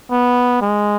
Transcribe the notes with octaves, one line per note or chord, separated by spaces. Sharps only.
B3
G#3